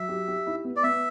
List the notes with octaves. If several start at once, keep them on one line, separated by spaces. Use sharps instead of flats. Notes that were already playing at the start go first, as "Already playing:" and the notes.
Already playing: F#3 E5
G4
G4
E4
B3
D5
B3 E5